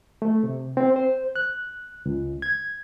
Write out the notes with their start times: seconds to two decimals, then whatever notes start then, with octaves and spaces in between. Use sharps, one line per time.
0.22 A3
0.43 C3
0.77 C4
0.96 C5
1.36 F#6
2.06 C#2
2.42 G#6